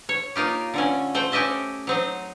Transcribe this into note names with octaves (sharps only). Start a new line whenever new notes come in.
C#5
A#3 D#4 F4 G4
D3 A3 C#4
A3 C5 G5
C#4 G4 D#5 E5 A5
F#3 C4 D#4